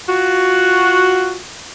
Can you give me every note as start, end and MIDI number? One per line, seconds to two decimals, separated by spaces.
0.08 1.37 65
0.08 1.37 66